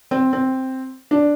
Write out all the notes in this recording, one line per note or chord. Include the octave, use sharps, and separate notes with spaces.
C4
C4
D4